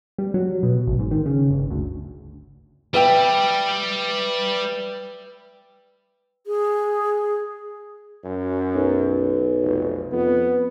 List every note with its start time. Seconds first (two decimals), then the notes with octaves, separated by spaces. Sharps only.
0.18 G3
0.34 F#3
0.63 B2
0.87 A1
0.99 G#2
1.11 D#3
1.26 C#3
1.50 G1
1.71 D2
2.94 G3 B4 E5 G5
6.47 G#4
8.25 F#2
8.75 B1
9.63 F1
10.12 F2 B3